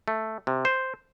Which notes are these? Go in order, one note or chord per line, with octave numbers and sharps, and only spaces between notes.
A3
C3
C5